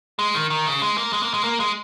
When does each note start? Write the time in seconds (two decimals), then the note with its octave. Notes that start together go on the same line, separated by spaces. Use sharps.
0.19 G#3
0.35 D#3
0.50 D#3
0.66 C#3
0.82 G#3
0.98 A#3
1.13 G#3
1.23 A#3
1.34 G#3
1.44 A#3
1.60 G#3